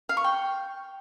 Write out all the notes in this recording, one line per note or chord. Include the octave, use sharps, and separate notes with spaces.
F5
C#6
G5